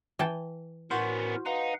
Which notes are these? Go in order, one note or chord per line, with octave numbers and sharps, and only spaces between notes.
E3 G5 A5
A2 B3 C#4 F#4 A#4 C5
D#4 B4 F5 F#5